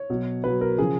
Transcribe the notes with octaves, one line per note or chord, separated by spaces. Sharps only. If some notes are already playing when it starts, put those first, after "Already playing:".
Already playing: C#5
B2 F#3
B2 F#3 B4
A#4
C#3 F3 G#4